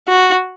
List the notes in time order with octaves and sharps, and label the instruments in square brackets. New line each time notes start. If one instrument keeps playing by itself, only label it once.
[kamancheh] F#4